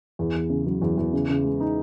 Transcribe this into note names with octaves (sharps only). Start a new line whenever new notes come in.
E2
E2
C#3
F#3
E2
E2
C#3
C#3
G#3
D#4